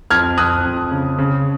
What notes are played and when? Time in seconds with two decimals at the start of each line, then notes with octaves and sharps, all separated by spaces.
0.10 F2 F6 G#6
0.38 F2 D#6 F#6
0.64 F2
0.91 C#3
1.19 C#3